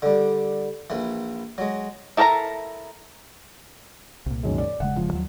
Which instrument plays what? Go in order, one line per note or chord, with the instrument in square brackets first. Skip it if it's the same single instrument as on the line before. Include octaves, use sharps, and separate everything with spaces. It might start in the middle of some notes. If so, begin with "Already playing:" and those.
[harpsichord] D3 G3
A#1 E3
F#3 G#3
[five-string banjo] E4 A4 A#4 C5 A#5
[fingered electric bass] C2 A#2
[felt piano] F#2 D#3 G#3
D5
[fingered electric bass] E1 C#3 G#3 [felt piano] F#5
[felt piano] F3
[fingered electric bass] D#2 F#3